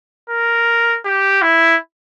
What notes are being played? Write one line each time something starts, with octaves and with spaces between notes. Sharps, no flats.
A#4
G4
E4